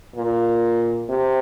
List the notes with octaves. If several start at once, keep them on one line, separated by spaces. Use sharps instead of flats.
A#2
C3